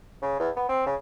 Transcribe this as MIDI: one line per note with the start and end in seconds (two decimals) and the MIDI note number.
0.22 0.37 49
0.40 0.50 40
0.56 0.66 59
0.69 0.85 60
0.86 0.95 49